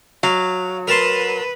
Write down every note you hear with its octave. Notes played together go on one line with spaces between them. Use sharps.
F#3 F5
A#4 B4 A5 C6